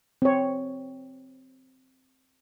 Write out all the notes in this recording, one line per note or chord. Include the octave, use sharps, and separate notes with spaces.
C4 C#5